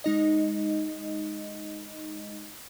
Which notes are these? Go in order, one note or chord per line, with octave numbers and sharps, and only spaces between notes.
G#3 D#4 D#5